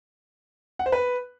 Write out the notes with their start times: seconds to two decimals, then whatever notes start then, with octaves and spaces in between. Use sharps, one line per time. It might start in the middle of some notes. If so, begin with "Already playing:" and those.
0.79 F#5
0.86 C5
0.92 B4